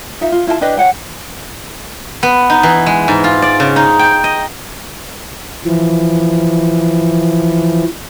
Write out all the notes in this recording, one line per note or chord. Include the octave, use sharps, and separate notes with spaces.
D#4 F4 E5
F4
E4 F4 A4 A5
D4 G4 B4 D#5
C#5 F#5 G5
B3
D#4
E3
G#3
G#2
F4
D5
C#3
D#4
G5
D#5
E3 F3